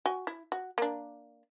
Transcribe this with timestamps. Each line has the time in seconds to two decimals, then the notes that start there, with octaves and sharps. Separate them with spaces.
0.06 F#4 G#5
0.27 E4
0.52 F#4
0.78 A#3 D4